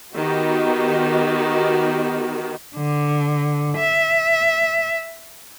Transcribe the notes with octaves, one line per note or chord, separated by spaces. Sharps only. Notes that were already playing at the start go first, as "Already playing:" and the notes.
D#3 B3 D#4 F#4 G4
D3
E5